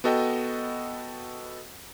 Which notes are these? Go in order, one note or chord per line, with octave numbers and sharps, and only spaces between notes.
B3 F#4 A4 D#5 G5